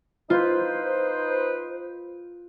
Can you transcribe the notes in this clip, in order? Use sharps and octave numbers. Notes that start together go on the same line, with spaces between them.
D#4 F4 B4 C5